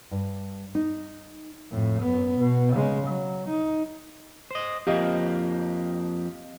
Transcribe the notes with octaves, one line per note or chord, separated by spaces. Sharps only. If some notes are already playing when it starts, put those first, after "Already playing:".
G2
D#4
F2 A2
F#2 B3
B2
C#3 G#3
F#3
D#4
C5 D#5
F2 F3 A#3 G4 D#5 F5